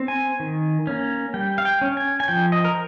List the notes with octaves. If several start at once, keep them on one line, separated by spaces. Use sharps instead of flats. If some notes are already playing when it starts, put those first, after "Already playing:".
Already playing: C4
G#5
D#3
A#3 C#4
G3 G5
F5
G5
C#4
G#5
G#5
F3 G5
D#5
A#4